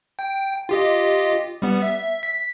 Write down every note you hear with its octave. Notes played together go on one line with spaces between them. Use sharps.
G5
F4 G4 D#5
G3 B3
E5
B6